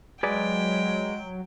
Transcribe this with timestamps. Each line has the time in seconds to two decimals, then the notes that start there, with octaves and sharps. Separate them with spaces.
0.23 F#3 G#3 G#4 B4 D5 G5